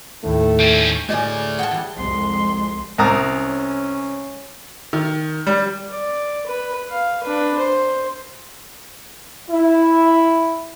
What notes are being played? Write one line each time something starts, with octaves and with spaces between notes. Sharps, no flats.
D#2 A2 A3
G3 C#4
A2 A3 G4 G#4 D5 D#5 G#5
G#4 E5 F#5 G5 A5
E3 G3
C2 F2 G#3 C6
C2 C#4 A#5 D#6
D#3
G3
D5
B4
F5
D4 B4
C5
E4